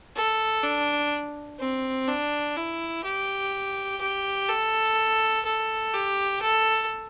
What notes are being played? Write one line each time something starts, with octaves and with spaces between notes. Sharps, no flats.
A4
D4
C4
D4
E4
G4
G4
A4
A4
G4
A4